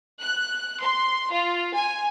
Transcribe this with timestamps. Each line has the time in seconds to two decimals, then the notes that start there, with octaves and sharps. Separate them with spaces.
0.19 F#6
0.80 C6
1.32 F4
1.74 G#5